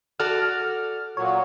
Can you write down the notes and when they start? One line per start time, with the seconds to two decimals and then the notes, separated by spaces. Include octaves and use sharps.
0.20 F#4 A4 D5 F6
1.17 A#2 F#3 C#5